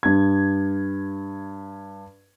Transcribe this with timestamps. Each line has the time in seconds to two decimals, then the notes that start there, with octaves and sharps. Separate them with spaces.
0.03 G2 G#6